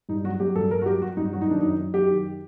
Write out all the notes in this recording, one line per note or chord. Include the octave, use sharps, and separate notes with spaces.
G2 D#4
F#3 F#4
F#3 G4
G2 A4
G2 A#4
F#4
F#3 G4
F#3 F#4
G2 D#4
F#3 F#4
D#4
D#3 D4
F#2 D#4
F#2
F#3 G4
D#3